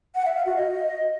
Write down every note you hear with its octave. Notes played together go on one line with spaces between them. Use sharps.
F#5
E5
F5
F#4
D#5